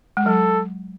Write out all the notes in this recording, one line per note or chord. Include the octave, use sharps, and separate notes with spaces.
G#3
F#3 A4